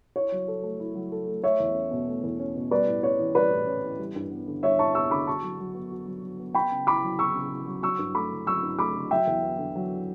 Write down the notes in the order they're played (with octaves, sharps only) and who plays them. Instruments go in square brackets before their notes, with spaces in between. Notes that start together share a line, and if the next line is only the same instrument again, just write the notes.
[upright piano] E4 [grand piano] C#5
[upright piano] F#3
A4
A3
E4
F#3
A4
A3
[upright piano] A3 [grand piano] C#5 E5
[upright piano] E2
C#4
B2
A3
E2
C#4
B2
[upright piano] G3 [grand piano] B4 D5
[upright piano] A2
[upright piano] C#4 [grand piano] C#5
[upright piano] E3
[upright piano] G3 [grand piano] B4 D5
[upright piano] A2
C#4
E3
G3
G2
B3
D3
[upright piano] G3 [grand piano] C#5 E5
[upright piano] G2 [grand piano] A5 C#6
[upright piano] B3 [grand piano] C#6 E6
[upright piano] D3 [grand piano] B5 D6
[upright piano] F#4 [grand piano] A5 C#6
[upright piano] F#3
F#3
B3
F#4
F#3
F#3
B3
[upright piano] B3 [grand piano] G5 B5
[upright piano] C#3
[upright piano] E4 [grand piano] B5 D6
[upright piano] F#3
[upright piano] B3 [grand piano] C#6 E6
[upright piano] C#3
E4
F#3
[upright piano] F#3 [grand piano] C#6 E6
[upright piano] G2
[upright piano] A3 [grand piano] B5 D6
[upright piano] D3
[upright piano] F#3 [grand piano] C#6 E6
[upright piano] G2
[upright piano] A3 [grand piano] B5 D6
[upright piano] D3
[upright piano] F#3 [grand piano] E5 G5
[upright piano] E2
B3
D3
F#3